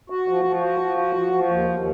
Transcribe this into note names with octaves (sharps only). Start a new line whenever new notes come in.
F#4
F3
F3
F#4
F3
F#4
F3
F3
D#2
D#2